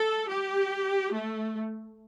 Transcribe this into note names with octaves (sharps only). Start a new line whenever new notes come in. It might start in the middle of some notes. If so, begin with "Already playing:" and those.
Already playing: A4
G4
A3